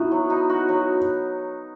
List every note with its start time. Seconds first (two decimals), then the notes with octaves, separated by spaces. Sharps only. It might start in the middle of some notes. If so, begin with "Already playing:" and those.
Already playing: B3 D#4 E4 F#4
0.11 F#3
0.30 D#4
0.50 F#4
0.69 F#3